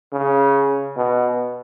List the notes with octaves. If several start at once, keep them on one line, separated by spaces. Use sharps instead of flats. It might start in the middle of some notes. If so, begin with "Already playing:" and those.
C#3
B2